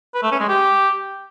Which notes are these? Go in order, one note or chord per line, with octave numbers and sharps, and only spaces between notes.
B4
A3
C#4
G#3
G4